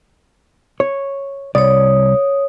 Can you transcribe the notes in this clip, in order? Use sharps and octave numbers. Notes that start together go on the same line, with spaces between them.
C#5
C2 C#5 D5 D#6